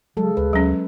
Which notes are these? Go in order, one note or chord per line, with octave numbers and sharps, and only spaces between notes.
C#3 F#3 G#3 A4
D2 B4
D2 F#3 C#4